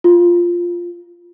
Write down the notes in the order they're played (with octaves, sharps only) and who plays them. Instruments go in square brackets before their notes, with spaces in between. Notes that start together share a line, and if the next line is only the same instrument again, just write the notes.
[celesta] F4